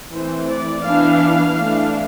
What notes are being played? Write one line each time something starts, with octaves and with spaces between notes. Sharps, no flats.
E3 A3 C4 C5
D5
E3 B3 D4 F5
E3 A3 D4